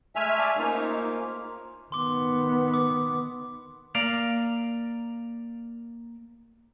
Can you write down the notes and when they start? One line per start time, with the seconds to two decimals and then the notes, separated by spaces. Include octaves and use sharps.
0.16 G#3 A3 E5 G#5 F6
0.38 G#4 D5 F5 A5
0.57 A#3 C#4 D#4 F4 C5
1.92 D#3 B3 C6 D6
2.74 D6 D#6
3.95 A#3 D5 F5